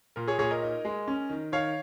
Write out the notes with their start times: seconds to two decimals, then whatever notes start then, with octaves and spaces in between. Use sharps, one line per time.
0.16 A#2 A#4
0.27 G#4 C#5
0.39 A#2 G#4 C#5
0.51 A#4 D#5
0.62 D#4
0.85 G#3
1.08 C#4
1.30 D#3
1.52 D#3 C#5 F5